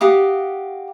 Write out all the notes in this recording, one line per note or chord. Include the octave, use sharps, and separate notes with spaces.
F#4 G4 F5 D#6